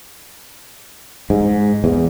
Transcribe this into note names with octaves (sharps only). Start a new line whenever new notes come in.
G#2
E2